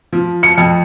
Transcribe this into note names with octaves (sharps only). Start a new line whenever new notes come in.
F3
C#7
F2